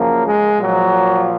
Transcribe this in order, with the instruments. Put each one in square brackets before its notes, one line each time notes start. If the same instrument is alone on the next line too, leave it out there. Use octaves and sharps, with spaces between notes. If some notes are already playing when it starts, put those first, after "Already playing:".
Already playing: [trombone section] F#2 C#3 F3 A#3
G#3
A#2 F3 F#3